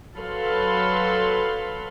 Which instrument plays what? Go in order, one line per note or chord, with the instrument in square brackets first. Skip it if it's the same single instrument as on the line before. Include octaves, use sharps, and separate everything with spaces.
[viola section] F#3 A4 B4 F5 B5 C6